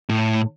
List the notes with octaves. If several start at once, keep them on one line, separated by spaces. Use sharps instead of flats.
A2